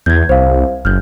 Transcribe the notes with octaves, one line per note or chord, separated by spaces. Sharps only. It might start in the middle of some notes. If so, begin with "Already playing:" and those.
E2 G6 G#6
C2 C5 F5
F#1 F6 G6